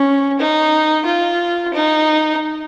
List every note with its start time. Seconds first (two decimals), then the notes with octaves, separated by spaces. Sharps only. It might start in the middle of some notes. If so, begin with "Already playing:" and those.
Already playing: C#4
0.39 D#4
1.06 F4
1.73 D#4